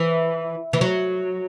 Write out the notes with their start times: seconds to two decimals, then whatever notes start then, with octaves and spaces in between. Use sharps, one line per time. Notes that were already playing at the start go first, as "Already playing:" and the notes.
Already playing: E3
0.73 E3
0.81 F#3